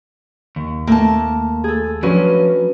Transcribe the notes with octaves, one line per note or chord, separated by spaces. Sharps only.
D#2
A3 A#3 A5
G#4 A4
F3 F#3 C#4 D4 F#4 B4